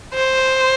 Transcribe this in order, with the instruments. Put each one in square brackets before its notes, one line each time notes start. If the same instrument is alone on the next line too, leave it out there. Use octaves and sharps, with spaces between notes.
[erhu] C5